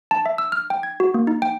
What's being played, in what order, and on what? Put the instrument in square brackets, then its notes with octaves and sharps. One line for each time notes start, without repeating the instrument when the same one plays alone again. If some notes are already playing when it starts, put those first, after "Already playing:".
[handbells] A5
E5
E6
F6
G5
G#6
F#4
A#3
D#4
G5